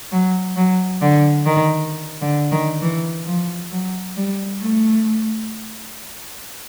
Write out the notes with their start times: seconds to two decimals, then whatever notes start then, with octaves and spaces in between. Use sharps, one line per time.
0.12 F#3
0.56 F#3
1.01 D3
1.47 D#3
2.22 D3
2.52 D#3
2.82 E3
3.27 F3
3.72 F#3
4.17 G3
4.62 A3